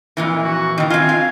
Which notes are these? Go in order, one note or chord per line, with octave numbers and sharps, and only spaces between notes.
F2 A#2 E3
F#4
D#3 E3
C4 F4 G#5
F5